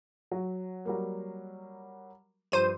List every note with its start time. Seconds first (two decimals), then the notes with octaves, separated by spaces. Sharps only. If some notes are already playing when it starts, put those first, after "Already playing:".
0.32 F#3
0.85 F#3 G3 A#3
2.52 G2 F3 C5 C6 D#7